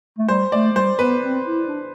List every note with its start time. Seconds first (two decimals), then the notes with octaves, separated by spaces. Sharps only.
0.18 A3
0.29 G3 C5
0.52 A3 D5
0.72 A3
0.75 G3 C5
0.98 B3 B4
1.22 C4
1.45 E4
1.68 D4